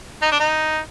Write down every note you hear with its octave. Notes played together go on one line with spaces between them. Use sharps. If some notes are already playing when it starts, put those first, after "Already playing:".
D#4
D4
D#4